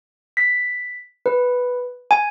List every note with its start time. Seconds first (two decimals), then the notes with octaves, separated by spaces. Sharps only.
0.37 B6
1.26 B4
2.11 G#5